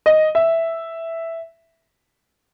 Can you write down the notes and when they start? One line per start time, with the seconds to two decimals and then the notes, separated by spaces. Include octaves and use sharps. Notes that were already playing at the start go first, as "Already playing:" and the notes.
0.06 D#5
0.35 E5